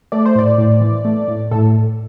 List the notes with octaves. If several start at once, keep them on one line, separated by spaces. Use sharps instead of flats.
A3 D5
C5
A2 D5
A2
E3
A3
A2
A2 A4